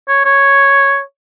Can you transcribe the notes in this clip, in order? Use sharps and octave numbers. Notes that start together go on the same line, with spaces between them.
C#5
C#5